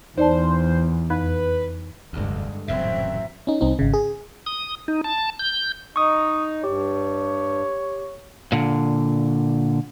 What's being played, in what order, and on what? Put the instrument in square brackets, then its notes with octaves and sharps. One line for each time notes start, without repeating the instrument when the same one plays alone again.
[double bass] E2 [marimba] D#4 D5 A5 [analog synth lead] C5
[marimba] F2 [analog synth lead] B4
[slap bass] F1 D2 [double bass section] G2 D3 G#3
[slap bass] D#1 F#2 C#3 [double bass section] A1 F#3 C4 [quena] E5
[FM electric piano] C#4 D#4
C2 C4 D#4
G#1 C#3
G#4
[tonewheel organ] D#6
D#4
A5
G6
[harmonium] D#4 [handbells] C#6 D#6
[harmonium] G2 [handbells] G4 [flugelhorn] C#5
[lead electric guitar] A#2 D3